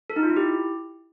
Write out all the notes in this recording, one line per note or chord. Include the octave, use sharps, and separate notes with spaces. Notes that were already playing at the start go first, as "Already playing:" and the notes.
A4
D#4
F4
E4
G4